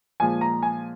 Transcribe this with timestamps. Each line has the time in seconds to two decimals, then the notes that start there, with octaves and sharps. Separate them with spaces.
0.20 A#2 F3 G#3 G#5
0.41 A#5
0.63 G#5